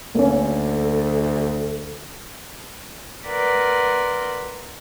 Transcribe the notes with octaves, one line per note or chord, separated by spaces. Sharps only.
D2 A#3 C#4 A4
A#4 B4 D5 F#5 C6